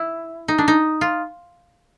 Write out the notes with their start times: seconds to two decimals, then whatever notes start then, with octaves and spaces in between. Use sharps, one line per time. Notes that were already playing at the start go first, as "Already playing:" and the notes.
Already playing: E4
0.48 D#4
0.58 D4
0.68 D#4
1.01 F4